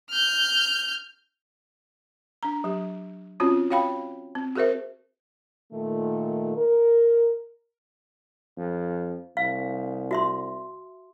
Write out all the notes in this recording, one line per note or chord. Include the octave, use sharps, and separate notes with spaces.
F6 G6
D4 A#5
F#3 G4
C4 C#4 F4 F#4 C#5
F#4 C#5 F5 G5 B5
C4
F#4 G#4 A#4 C5 E5
A#2 D#3 A3
A#4
F2
C2 F5
F#4 E5 C6